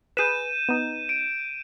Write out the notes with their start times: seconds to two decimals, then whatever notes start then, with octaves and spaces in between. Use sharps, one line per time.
0.17 G#4 B4 G6 D#7 E7
0.69 B3 D#4
1.09 D7